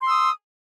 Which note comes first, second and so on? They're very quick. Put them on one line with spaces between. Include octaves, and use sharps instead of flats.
C6 E6 D#6